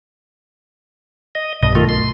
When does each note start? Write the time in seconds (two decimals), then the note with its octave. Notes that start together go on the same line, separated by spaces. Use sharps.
1.35 D#5
1.63 B1 G2 D#5
1.75 D#3 A3 F4
1.89 C6